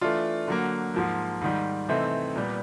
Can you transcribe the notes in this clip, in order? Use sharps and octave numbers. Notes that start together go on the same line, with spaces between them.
E3 A3 D4 F4
D3 F#3 A#3
G#2 F3 A#3
G#2 D#3 G3
C3 E3 A3 C4 D#4
A#2 G3 B3